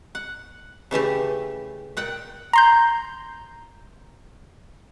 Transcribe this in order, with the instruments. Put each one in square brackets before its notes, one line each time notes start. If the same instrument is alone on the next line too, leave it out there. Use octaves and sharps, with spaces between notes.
[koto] F#5
C#3 E3 A3 G4
A#2 F#5 G5
[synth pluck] A#5 C6 G6